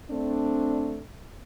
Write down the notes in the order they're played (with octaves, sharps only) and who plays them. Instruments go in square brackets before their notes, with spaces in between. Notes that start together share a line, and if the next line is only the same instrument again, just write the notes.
[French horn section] A3 C4 D4